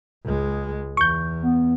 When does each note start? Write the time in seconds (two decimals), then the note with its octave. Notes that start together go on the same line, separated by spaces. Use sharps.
0.24 C#2 G#3
0.97 E2 C#6 G6
1.42 B3